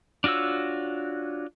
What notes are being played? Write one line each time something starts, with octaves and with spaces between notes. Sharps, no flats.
D4 F4 F#4 C#5 E6